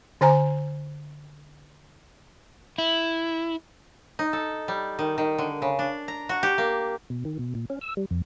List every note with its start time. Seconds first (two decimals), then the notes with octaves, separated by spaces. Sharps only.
0.21 D3 C5 G#5 A#5
2.78 E4
4.19 D#4
4.33 A4
4.68 G3
4.99 D#3
5.18 D#3
5.38 D3
5.62 C#3
5.79 D4
6.08 A#5
6.29 F#4
6.43 G4
6.58 A#3
7.10 B2
7.25 D#3
7.39 B2
7.55 A#2
7.70 C#4
7.81 E6
7.97 G3
8.11 F2